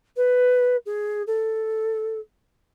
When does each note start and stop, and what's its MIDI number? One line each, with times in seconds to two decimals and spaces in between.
0.17 0.76 71
0.86 1.23 68
1.27 2.20 69